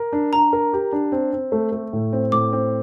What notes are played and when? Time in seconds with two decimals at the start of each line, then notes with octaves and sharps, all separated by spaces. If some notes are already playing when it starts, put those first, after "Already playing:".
Already playing: A#4
0.13 D4
0.33 D4 A#5
0.53 A#4
0.73 G4
0.93 D4
1.12 C4
1.33 C4
1.52 A3
1.72 A3
1.93 A2
2.13 C4
2.32 A2 D6
2.53 C4